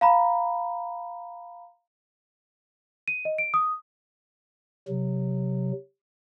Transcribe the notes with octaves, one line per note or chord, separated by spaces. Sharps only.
F5 A#5 B5
D#7
D#5
D7
D#6
C3 F#3